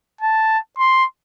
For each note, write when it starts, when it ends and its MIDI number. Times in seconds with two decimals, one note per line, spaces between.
0.21 0.58 81
0.78 1.05 84